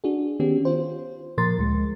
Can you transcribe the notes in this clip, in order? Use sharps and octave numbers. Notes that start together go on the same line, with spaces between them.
D4 F#4 G#4
D#3 B3 C#4 G4
F4 C5
A#2 F3 A#4 C6 A6
D2 G#3